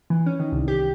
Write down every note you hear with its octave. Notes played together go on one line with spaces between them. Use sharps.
E3
C#4
D#3
C2
G4